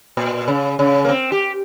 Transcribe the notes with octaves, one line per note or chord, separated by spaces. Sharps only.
A#2
C#3
C#3
A#3
C4
G4